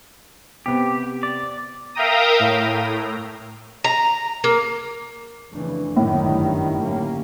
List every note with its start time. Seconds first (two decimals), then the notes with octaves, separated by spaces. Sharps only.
0.66 C3 B3 G4
1.23 D5
1.95 A#4 E5 F5 G5 A#5 D#6
2.40 A2
3.84 A#5
4.44 A#3
5.52 F2 C#3 E3 A3 B3 D4
5.97 G1 F#2 A2 D#3 C#5 D5 F#5
6.27 D3 G3 A3
6.80 A#3 C#4